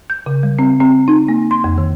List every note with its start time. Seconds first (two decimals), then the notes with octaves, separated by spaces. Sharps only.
0.10 G6
0.26 C#3
0.43 G3
0.59 C4
0.80 C4
1.08 D#4
1.28 A#3
1.51 C6
1.64 F2
1.78 D#3